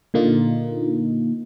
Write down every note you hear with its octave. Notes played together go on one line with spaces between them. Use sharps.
A#2 D3 A#3 D#4 F4